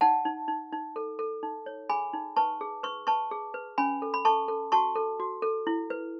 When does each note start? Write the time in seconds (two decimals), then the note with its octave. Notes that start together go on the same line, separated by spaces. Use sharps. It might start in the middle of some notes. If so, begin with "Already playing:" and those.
0.01 D#4 F#5 A5
0.25 D#4
0.48 D#4
0.73 D#4
0.96 A4
1.19 A4
1.43 D#4
1.66 C#5
1.89 G#4 G#5 B5
2.13 D#4
2.36 B4 A5 C#6
2.61 G#4
2.83 B4 C#6
3.07 B4 A5 C#6
3.31 G#4
3.54 B4
3.78 C#4 G#5 B5
4.02 A4
4.14 B5
4.25 A4 A5 C#6
4.48 A4
4.72 F#4 A5 C#6
4.96 A4
5.20 F#4
5.42 A4
5.67 E4
5.90 B4